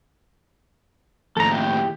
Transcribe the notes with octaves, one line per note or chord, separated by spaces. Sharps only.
D#2 A2 A4 A#5
G4